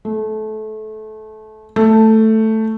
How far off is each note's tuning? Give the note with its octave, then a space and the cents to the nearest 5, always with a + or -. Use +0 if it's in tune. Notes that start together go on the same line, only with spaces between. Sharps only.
A3 -25
A3 +5